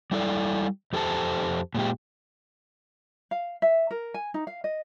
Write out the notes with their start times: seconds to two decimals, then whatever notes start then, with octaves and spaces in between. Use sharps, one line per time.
0.11 G3 E4 A4 D5
0.93 F2 G4 A4 C5 A5
1.75 A#2 G#3 G4
3.31 F5
3.62 E5
3.91 A#4
4.14 G#5
4.34 D#4
4.47 F5
4.64 D#5